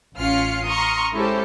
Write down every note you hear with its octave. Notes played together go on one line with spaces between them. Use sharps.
A1 C#4 F4 F6 C7 C#7
A#5 C6 C#6 D#6 F6
G#3 C#4 E4 G4 A4 C5